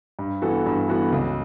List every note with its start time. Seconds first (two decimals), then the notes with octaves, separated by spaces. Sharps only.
0.19 G2
0.42 E3 B3 F#4 A4
0.66 G2
0.89 E3 B3 F#4 A4
1.12 C#2